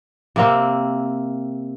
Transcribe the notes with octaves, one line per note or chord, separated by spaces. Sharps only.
C3 A#3 C4